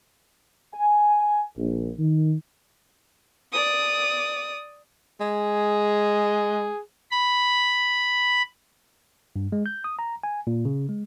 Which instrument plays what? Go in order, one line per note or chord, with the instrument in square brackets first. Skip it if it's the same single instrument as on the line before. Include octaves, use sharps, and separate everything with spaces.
[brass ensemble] G#5
A#1
D#3
[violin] D5 D#6
[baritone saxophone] G#3 [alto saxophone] G#4
[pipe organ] B5
[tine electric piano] G2
G#3
G6
D#6
A#5
G#5
A#2
C#3
G#3